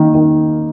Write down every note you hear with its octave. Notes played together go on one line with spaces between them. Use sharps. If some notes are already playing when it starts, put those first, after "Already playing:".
Already playing: D#3 A#3
D#3